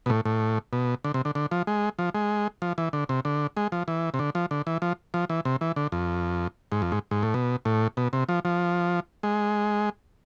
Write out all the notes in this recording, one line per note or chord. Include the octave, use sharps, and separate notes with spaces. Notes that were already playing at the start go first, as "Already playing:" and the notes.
B2
A2
A2
B2
D3
C3
D3
D3
F3
G#3
F3
G#3
F3
E3
D3
C3
D3
G#3
F3
E3
C3
D3
F3
D3
E3
F3
F3
E3
C3
E3
D3
F2
G#2
F2
G#2
G#2
A2
B2
A2
B2
C3
F3
F3
G#3